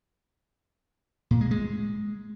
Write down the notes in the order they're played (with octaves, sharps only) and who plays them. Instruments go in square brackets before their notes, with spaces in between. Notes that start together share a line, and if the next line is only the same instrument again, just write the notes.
[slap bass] A#2
G#3
G#3